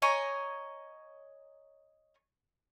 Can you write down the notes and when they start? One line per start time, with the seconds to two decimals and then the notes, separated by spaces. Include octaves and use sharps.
0.02 C#5 D#5 G#5 A#5